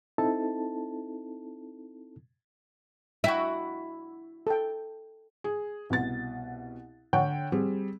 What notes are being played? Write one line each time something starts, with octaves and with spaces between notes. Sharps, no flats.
C4 D#4 E4 A4 A5
E4 F#4 E5 G5
A4 G5
G#4
C2 B2 A6
D3 C#5 F#5 G5 C#6
G3 C4 G#4